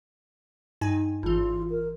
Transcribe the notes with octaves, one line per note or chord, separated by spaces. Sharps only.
G2 D#4 G#5
G#1 E3 F4
A#4